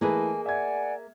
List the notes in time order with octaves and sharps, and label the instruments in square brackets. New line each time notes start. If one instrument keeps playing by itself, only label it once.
[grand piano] E3 A3 B4 [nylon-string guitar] A#3 G#4 D#5 [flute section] G#5
[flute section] D5 F#5 G#5 [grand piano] E5 G#6